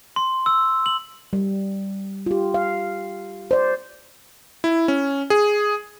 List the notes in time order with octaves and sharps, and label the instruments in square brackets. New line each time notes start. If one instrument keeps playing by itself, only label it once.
[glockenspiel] C6
E6
F#7
[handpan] G3
F4 G4
F5
C5 D5
[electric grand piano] E4
C#4
G#4